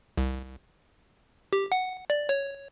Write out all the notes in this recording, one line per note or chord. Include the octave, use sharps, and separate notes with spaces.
C2
G4
F#5
D5
C#5